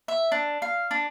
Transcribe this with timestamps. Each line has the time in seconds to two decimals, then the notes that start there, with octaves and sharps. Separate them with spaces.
0.08 E5
0.32 D4
0.62 F5
0.91 D4